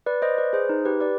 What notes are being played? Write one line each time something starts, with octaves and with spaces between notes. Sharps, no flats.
B4 D5
C5 D#5
B4 D5
G#4 C5
D#4
G4 B4
B4 D5